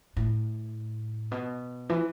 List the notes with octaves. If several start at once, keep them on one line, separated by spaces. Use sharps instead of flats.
A2
B2
E3